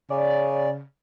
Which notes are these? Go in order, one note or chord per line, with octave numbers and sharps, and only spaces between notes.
C#3 D5